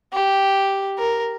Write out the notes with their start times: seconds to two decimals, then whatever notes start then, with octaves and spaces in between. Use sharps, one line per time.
0.13 G4
0.99 A#4